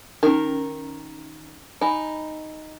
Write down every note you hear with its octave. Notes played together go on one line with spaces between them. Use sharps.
D#3 C#4 D#4 A#4
D#4 G#5 B5